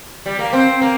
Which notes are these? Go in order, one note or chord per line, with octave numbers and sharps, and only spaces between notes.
G3
A#3
C4
A#3